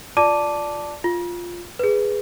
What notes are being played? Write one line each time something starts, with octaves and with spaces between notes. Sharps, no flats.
F4 D5 A5 D6 D#7
F4
G#4 B4